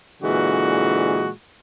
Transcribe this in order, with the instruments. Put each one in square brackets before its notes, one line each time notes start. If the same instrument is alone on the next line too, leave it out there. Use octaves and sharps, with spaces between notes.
[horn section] A#2 D3 E3 G#3 F#4